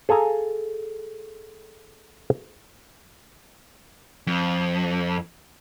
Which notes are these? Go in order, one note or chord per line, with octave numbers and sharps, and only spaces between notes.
G#4 A4 F5 G#5 A#5
F2